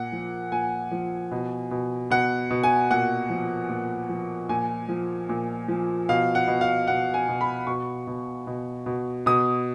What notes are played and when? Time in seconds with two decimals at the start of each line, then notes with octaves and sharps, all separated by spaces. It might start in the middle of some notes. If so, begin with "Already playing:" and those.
Already playing: A#2 F#5
0.12 F3
0.52 A#2 G#5
0.91 F3
1.32 B2
1.71 B2
2.10 B2 F#5
2.50 B2
2.63 G#5
2.90 A#2 F#5
3.30 F3
3.69 A#2
4.09 F3
4.49 A#2 G#5
4.89 F3
5.29 A#2
5.68 F3
6.09 B2 F5
6.35 F#5
6.48 B2
6.61 F5
6.87 B2 F#5
7.14 G#5
7.28 B2
7.41 B5
7.67 B2 C#6
8.07 B2
8.47 B2
8.86 B2
9.26 B2 D#6